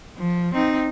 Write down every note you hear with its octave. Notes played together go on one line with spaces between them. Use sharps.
F3
C4 D#4